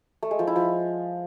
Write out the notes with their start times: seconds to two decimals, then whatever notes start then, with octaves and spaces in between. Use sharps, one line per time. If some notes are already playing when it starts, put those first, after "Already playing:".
0.23 A3
0.31 G#3
0.39 F3
0.47 E4
0.56 F3